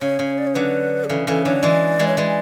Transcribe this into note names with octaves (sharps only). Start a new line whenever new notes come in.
C#3 C#5
C#3
D5
C#5
D3 F#3 B4
G#4
C#3 E3 A4
C#3 E3 A4
D3 F#3 C#5
E3 G#3 D5
E3 G#3
C#5
E3 G#3 D5